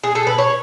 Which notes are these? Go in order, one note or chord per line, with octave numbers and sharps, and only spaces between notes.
G#4
A4
B4
C#5